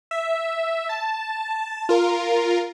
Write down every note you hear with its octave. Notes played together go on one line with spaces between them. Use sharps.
E5
A5
F4 A#4